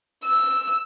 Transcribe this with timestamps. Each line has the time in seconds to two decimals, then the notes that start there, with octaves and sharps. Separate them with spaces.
0.25 E6